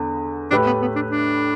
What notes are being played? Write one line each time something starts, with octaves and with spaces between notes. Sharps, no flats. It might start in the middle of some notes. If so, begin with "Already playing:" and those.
Already playing: E2 D3 B3
A2 A3 D4 G4 B4
B3
B3
D4
D4